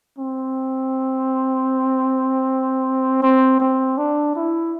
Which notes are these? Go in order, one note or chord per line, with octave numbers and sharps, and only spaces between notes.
C4
C4
C4
D4
E4